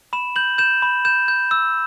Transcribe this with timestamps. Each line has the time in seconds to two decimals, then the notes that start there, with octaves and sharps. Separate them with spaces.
0.13 B5 E7
0.36 G6 F#7
0.58 G6 E7
0.82 B5
1.05 G6 E7
1.28 G6
1.51 E6